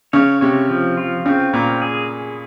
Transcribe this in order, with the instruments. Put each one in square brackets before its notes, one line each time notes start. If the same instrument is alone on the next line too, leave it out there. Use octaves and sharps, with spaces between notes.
[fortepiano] C#3 [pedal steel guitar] C#5
[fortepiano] C3 [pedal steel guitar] C#5
[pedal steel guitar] F3
F4
[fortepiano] C#3 [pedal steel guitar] C4
[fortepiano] A#2 [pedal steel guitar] A#4
[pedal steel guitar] G#4